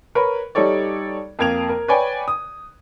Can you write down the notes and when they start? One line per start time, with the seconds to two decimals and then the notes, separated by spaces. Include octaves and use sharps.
0.15 A#4 B4 C#5 B5
0.55 G3 D#4 A4 C#5 D5
1.39 F2 A#3 A#4 G#6 D7 F7
1.69 A#4
1.88 B4 C#5 D5 G5 G#5
2.28 D#6